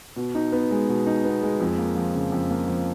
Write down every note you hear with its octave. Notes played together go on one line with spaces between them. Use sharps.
B2
D#4
B3
G#3
B2
D#4
B3
G#3
F2
A#3
F3
C#3
F2
A#3
F3